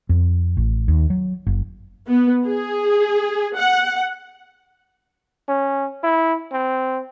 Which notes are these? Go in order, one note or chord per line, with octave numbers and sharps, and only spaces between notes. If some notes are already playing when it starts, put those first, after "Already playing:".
F2
A1
D#2
F#3
F#1
B3
G#4
F#5
C#4
E4
C4